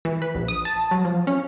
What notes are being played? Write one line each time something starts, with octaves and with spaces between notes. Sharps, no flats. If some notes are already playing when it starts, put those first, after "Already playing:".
E3
B4
A#1
D#6
A5
F#3
F3
C#4